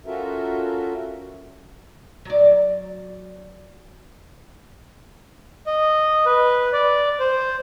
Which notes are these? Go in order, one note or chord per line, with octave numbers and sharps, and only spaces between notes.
C#4 F4 F#4 A4 A#4 E5
F#3 D5
D#5
B4
D5
C5